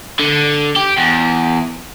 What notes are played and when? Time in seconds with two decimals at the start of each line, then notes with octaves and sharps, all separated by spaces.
0.19 D3
0.76 G4
0.98 E2